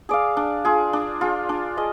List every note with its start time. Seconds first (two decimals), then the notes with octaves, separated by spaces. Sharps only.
0.09 G#4 D5 F5
0.37 D4
0.65 F4 G#4
0.93 D4
1.21 F4 G#4
1.49 D4
1.77 G#4 D#5